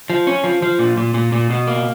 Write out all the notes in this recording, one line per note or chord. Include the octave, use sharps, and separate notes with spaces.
F3
C#4
F3
F3
A#2
A#2
A#2
A#2
B2
A#3